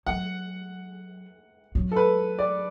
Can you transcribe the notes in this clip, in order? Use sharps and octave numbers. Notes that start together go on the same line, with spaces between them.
F#3 F#5
F#3
A4
B4
D5